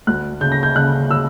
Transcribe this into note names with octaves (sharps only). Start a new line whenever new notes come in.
D2 F#6
C#3 G6
A#6
G6
C#3 F#6
C#3 E6